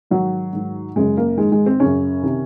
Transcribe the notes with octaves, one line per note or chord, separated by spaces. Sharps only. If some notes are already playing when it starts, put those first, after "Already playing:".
G#2 D#3 F#3
G#2 D#3
F#2 C#3 G#3
A#3
G#2 D#3 G#3
G#3
C4
F#2 C#3 C#4
C3 D#3